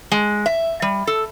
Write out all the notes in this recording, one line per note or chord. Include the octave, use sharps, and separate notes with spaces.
G#3
E5
G3
A4